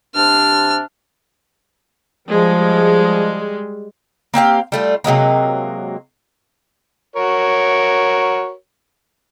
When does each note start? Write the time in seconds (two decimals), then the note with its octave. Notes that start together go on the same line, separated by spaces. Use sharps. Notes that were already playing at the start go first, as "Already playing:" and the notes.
0.15 C3 D4 F6
2.29 F3 G3 G#3
4.34 A#3 C4 G4 F5
4.72 G3 A3 F4
5.04 C3 F#3 G#3 A#3
7.16 F#4 A#4 C#5